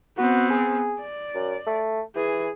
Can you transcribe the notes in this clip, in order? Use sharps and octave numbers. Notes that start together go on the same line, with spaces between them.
B3 C4 F#4
G#4
D5
F#2
A3
E3 G#4